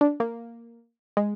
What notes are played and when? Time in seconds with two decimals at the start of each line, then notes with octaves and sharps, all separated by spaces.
0.01 D4
0.20 A#3
1.17 G#3